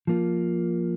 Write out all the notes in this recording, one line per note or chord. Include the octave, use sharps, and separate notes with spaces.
F3 A#3 F4